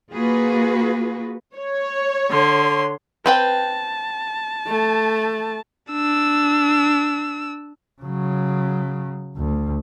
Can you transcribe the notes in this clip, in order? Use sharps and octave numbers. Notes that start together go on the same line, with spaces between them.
A#3 F4 F#4 G#4 B4
C#5
D3 C6
C4 B4 G5 A5
A3
D4 E6
C#3 F#3
D2